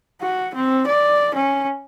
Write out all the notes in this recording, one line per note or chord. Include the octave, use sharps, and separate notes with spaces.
F#4
C4
D5
C#4